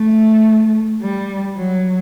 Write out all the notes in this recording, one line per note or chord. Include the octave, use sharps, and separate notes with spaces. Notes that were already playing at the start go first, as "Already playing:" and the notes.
Already playing: A3
G3
F#3